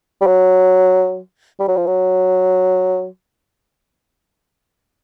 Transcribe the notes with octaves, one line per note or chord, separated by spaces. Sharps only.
G3
F#3
G3
F#3
F3
F#3